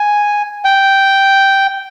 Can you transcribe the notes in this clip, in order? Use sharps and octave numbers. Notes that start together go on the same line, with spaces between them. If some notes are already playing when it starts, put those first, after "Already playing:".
Already playing: G#5
G5